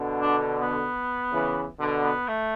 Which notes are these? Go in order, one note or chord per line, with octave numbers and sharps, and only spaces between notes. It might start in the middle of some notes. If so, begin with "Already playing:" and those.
Already playing: B2 D3
D4
B3
C#3 E3
B2 D3
B3
A3